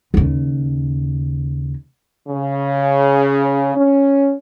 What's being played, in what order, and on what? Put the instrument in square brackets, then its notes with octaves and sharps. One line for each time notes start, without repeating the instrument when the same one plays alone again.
[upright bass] D#2 C#3
[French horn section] C#3
C#4